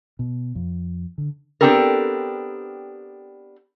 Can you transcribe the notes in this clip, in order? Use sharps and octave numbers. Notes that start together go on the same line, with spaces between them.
B2
F2
D3
B3 C4 D4 G4 A4 A#4